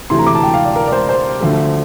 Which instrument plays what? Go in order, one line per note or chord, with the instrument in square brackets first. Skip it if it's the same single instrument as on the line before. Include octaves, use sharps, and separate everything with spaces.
[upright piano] D2 C3 E3 A3 E4 C6
A#5
D6
A5
G5
F5
D5
A#4
D5
C5
C5
D2 D3 F3 A3